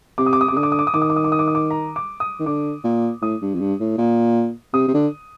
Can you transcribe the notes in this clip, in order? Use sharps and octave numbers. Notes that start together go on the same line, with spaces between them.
C3 D6
D#6
D6
D#6
D6
C3
D3 D#6
D6
D#6
D6
D#6
D#3 D6
D#6
D6
D#6
D6
D#6
D6
D#6
D6
A#5
D6
D#6
D#3
D3 D6
A#2
A2 D#6
G2
F2
G2
A2
A#2
C3 D#6
C3
D3